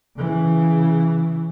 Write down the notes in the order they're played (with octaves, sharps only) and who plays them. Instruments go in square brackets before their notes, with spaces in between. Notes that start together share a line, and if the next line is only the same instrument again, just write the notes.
[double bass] C#3 E3